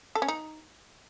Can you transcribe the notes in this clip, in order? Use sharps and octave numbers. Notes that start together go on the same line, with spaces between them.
A4
C#4
D#4